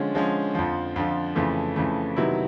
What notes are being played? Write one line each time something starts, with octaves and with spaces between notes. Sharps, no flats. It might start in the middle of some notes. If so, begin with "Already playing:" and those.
Already playing: D3 F3 G#3 C#4
D3 F3 G#3 C#4
F2 D3 F3
F2 D3 F3
F2 C#3 E3 A3
F2 C#3 E3 A3
C3 D#3 F#3 B3 E4